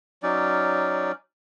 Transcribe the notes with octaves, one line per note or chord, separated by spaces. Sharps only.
F#3 C#4 D#4 D5